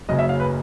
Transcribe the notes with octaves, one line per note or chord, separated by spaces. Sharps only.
F#1 F#2 C#3 D#5
E5
F5
B4